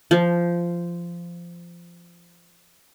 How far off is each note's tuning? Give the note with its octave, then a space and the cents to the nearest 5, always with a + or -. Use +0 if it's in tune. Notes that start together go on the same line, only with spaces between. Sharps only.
F3 -15